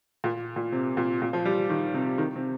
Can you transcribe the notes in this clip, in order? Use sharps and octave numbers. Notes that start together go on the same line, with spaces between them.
A#2
A#2
C3
A#2
A#2
F3
G3
D#3
C3
D#3
C3